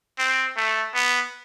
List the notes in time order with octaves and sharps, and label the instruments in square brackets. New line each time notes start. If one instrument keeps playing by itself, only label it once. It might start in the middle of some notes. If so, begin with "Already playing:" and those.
[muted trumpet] C4
A3
B3